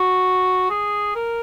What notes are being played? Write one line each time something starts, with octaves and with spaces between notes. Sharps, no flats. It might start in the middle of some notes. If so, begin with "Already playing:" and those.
Already playing: F#4
G#4
A#4